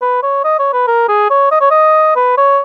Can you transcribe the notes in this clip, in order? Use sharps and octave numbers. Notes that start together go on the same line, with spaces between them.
B4
C#5
D#5
C#5
B4
A#4
G#4
C#5
D#5
C#5
D#5
B4
C#5